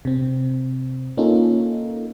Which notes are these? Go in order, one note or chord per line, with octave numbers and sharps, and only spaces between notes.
C3 C4
A#3 C#4 D#4 F4 A4